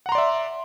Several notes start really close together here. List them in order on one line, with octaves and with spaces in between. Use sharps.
F#5 A#5 C6 D5 E5